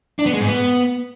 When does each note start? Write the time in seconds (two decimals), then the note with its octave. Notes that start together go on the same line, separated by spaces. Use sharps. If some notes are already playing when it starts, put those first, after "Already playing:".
0.19 D4
0.26 B3
0.33 G#3
0.40 G#2
0.48 B3